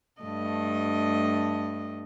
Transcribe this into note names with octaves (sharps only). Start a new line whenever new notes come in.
G2 A3 D#5